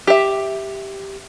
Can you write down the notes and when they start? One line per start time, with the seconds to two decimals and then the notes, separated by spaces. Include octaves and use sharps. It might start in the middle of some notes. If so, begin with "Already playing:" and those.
0.07 G4 E5